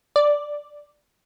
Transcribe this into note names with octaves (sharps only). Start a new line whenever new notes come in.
D5